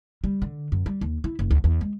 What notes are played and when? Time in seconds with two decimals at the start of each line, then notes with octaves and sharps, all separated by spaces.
0.24 G3
0.42 D3
0.72 F#2
0.86 G3
1.01 D#2
1.24 E4
1.39 F#1
1.51 D2
1.64 E2
1.81 G#3